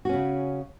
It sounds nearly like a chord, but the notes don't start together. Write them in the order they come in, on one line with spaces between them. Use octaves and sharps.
F#4 C#4 C#3